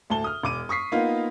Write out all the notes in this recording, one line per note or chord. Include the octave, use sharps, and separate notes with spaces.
D2 A2 A5 G7
D#6 F6
E1 D6 D#7
C#6 D#6 B6 C7
A#3 B3 D#4 F4